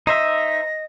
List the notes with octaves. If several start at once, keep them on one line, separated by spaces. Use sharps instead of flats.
D#4 C5 D#5 E5 A#6